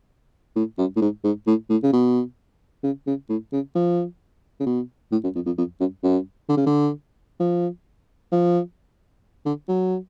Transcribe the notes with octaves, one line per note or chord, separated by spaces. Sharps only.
A2
F#2
A2
G#2
G#2
A2
A2
C#3
B2
C#3
C#3
A2
C#3
F3
C#3
B2
A2
F#2
F2
F2
F2
F#2
F#2
D3
C#3
D3
F3
F3
D3
F#3